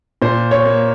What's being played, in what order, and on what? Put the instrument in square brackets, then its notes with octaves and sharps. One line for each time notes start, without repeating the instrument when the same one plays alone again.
[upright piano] A#2 C5
C#5
A#3